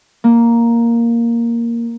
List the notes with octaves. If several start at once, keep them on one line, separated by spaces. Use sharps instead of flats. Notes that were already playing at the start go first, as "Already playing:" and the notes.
A#3